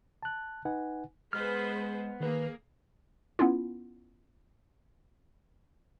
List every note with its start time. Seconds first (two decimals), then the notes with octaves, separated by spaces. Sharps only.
0.23 A5 F#6
0.65 D#4 B4 F#5 G#5
1.33 G#3 B3 G#4 B4 C5 F6
2.20 D#3 A#3 G#4 B4
3.39 B3 C#4 E4 F4